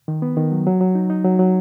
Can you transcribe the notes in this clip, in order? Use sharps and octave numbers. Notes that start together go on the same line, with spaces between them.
D#3
B3
D#3
F#3
F#3
F#3
D#4
D#4
F#3
F#3